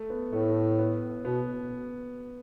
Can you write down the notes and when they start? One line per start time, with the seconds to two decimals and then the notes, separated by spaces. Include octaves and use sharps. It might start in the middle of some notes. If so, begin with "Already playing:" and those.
Already playing: A3
0.10 B3
0.33 A2 A3
0.79 B3
1.24 B2 B3